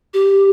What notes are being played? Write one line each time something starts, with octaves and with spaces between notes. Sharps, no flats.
G4